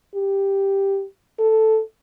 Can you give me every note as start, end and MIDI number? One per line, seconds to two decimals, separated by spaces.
0.15 1.04 67
1.39 1.80 69